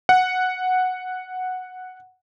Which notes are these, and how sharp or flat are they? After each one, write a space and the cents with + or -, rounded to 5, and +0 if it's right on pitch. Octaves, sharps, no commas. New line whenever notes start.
F#5 -5